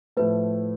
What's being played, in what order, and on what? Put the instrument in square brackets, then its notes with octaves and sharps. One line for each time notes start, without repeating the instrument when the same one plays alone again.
[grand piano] A2 F3 A3 [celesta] B4